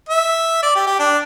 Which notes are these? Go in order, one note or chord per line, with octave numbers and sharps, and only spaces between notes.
E5
D5
G4
G4
D4